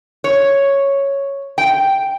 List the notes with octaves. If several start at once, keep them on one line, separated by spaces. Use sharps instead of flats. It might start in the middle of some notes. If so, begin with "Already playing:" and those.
C#5
G5